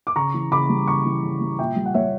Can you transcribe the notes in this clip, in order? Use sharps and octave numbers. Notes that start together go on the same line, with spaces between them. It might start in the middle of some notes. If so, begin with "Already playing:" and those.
D6
C#3 A#5 C#6
E3
C#3 B5 D6
G3
C#3 A#5 C#6
E3
C#3
G3
A#2 E5 G5
G3
F#5
G3 C#5 E5